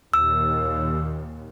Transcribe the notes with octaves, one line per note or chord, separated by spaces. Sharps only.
D#2 A#2 E6